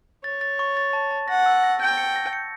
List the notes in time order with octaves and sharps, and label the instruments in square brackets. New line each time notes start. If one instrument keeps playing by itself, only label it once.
[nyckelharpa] C#5 [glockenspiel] A6
[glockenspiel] A6
C#6
A6
A5
A5
[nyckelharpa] F#5 [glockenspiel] A#6
[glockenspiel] E6
A#6
[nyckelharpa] G5 [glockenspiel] G6
[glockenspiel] C#7
A#6
C#7